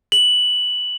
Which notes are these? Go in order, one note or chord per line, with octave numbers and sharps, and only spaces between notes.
F#7